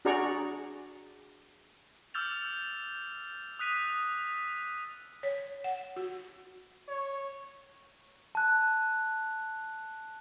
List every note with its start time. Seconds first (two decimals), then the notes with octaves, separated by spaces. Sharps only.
0.05 D4 F#4 G#4 D5 A#5 C#6
2.14 D6 E6 F6 G6 A6 F7
3.59 D#6 F#6 B6 D#7
5.23 C#5
5.64 F#5
5.96 F#4
6.88 C#5
8.35 A5 F#6